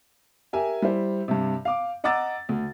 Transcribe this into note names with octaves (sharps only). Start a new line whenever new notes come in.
G4 A#4 E5 G#5
G3 E4 C5
G2 C3
F5 D6
D#5 F#5 A#5 D6 E6 A6
D2